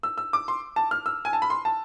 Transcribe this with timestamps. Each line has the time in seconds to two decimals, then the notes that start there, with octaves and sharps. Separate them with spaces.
0.03 E6
0.18 E6
0.33 D6
0.48 C6
0.76 A5
0.91 F6
1.06 E6
1.25 G#5
1.33 A5
1.42 B5
1.50 C6
1.65 A5